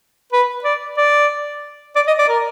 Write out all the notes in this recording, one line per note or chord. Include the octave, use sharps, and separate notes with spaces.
B4
D5
D5
D5
D#5
D5
A#4